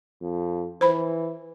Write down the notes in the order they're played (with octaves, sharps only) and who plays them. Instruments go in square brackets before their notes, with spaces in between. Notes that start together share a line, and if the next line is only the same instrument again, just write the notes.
[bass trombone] F2
[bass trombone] E3 [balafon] C5 B5